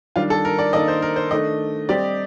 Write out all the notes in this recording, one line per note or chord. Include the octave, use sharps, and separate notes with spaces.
D#3 G3 D4 F4
A4
A#4
D5
D#3 A#3 D4 A4 D5 D#5
C5
A#4
C5
D#3 A3 D4 D#5
G3 C4 G4 D5